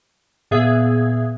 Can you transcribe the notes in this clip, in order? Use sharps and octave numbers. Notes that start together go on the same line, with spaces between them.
A#2 B3 G#4 E5 D#6 G#6